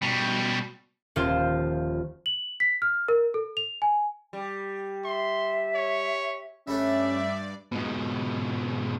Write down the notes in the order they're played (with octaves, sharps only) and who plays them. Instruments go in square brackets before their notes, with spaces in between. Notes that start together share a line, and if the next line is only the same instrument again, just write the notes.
[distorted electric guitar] B2 G3
[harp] D#1 F3 F4 C5
[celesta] F#7
B6
F6
A#4
A4
F7
G#5
[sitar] G3
[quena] E5 [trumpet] C6
[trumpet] C#5
[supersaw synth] G2 D5 [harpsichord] G3 A3 D4 [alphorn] C#4 [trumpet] E5
[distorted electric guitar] G#2 B2